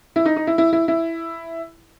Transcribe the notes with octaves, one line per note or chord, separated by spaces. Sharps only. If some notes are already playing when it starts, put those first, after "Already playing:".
E4
D#4
D#4
E4
E4
E4
E4